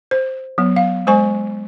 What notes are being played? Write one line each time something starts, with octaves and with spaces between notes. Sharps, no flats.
C5
F#3 B3
F5
G#3 C5 G#5 C#6